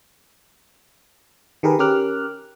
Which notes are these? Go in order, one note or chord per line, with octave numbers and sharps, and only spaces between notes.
D#3 G4 G#4 A#4 B4
C#4 G4 A#4 D6 F6 F#6